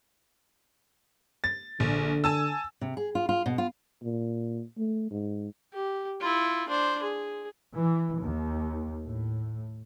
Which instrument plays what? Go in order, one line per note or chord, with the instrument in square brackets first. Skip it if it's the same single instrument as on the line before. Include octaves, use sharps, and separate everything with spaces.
[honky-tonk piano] A6
[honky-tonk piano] A#1 [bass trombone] D3
[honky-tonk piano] G#5 A5 E6
[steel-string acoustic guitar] C3
G#4
F4
F4
B2
F4
[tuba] A#2
A3
G#2
[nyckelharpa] G4
E4 F4
D4 C5
G#4
[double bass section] E3
D#2
A2